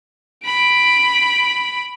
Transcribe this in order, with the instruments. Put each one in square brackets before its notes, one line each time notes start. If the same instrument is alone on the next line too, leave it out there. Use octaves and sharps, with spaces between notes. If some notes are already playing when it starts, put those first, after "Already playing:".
[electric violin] B5 D7